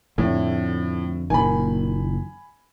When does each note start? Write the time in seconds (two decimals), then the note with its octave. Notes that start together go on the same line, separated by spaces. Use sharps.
0.18 F2 A2 D3
1.30 F#1 A#2 D#3 G#5 B5